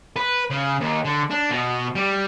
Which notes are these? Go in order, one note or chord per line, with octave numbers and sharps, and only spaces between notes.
B4
C#3
D#2
D3
D4
B2
G3